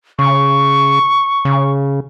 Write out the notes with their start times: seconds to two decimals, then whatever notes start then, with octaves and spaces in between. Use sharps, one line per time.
0.19 C#3 C#6
1.45 C#3